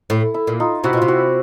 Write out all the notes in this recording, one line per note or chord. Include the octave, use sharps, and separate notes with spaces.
A2 E4
E4
A#2
D#4 F4
C3 E4 F#4
B2
C3 F4
E4 F#4